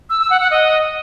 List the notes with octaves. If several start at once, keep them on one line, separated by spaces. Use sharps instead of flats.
E6
E6
F#5
F#5
D#5